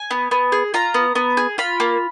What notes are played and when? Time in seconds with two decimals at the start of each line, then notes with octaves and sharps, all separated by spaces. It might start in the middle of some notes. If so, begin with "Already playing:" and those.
Already playing: G#5
0.11 B3
0.31 B3
0.52 G#4
0.74 F4 A#5
0.94 B3
1.15 B3
1.37 G#4
1.58 F4 B5
1.80 A#3